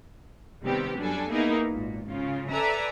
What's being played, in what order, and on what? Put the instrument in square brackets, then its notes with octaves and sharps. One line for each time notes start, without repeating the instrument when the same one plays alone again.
[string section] C3 D#3 G3 B3 C4 G4
F#2 F#3 G3 D4 A4 G#5
A#3 B3 D#4 E4 G#4 A#4
G#1 A#2
C#3 F4
A4 B4 D5 E5 G#5 A#5